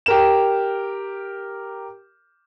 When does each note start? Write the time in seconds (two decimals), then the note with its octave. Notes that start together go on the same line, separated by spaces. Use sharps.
0.06 G4 A#4 E7